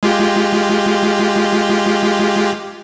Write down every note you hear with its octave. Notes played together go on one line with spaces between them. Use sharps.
G#3 F4 G4